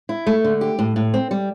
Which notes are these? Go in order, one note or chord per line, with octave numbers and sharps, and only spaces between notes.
E4
A3
D3
G4
A2
A2
C4
G3